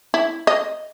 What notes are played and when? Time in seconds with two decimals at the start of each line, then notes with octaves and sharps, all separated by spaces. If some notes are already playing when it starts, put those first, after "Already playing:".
0.14 E4
0.47 D#5